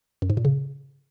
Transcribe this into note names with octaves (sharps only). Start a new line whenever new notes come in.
F#2
G#2
A#2
C#3